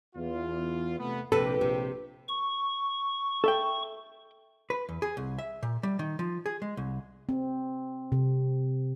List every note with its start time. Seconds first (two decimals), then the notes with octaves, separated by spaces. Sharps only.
0.16 E2 F4
0.99 C3 A3 B3
1.32 A#1 C3 G4 A4 B4
1.61 C3
2.28 C#6
3.44 A4 E5 G5
4.70 B4
4.89 E2
5.02 G#4
5.17 C2
5.39 E5
5.63 A#2
5.83 G3
5.99 D#3
6.19 F3
6.46 G#4
6.62 G#3
6.77 C2
7.29 C4
8.12 C3